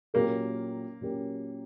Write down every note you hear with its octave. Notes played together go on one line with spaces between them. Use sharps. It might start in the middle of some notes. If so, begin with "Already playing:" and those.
A#2 F#3 A#3 C#4 G4 A#4
A#2 F#3 C#4 G4 A#4